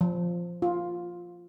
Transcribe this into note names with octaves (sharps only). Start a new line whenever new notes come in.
F3
F4